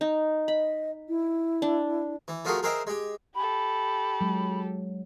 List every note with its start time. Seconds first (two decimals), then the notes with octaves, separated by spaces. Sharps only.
0.01 D#4
0.48 D#5 B5
1.09 E4
1.62 D4
2.28 E3
2.45 F3 A3 F4 F#4 G#4 A#4
2.63 G#4 A#4 C5 D#5 E5 G5
2.87 G#3 G4
3.35 G4 A4 B5
4.21 F#3 G#3